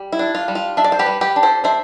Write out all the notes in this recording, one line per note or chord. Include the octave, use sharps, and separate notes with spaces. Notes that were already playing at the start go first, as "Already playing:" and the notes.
Already playing: G3
E4
D4
F4
G3
F4
D4 E5
D5
C5
G4 B4
G3
G4 B4
D4
A4 C5
D4 C5 E5